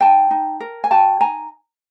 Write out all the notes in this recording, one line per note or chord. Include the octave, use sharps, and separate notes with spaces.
D#4 G5 A5
D#4
A#4
G#5
F#4 G5 A5
D#4 G#5 A#5